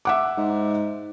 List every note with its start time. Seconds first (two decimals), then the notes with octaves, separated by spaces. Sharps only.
0.05 E5 F#5 D6
0.37 G#2